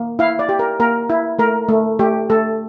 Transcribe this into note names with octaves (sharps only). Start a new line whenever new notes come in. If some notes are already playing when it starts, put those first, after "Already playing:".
Already playing: A#3
E4 F5
D5
G4
A#4
A#3 A#4
E4
A3 A#4
A3
A3 G4
A3 A4